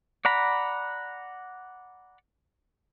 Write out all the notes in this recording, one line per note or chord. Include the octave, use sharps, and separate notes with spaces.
D5 F#5 A#5 B5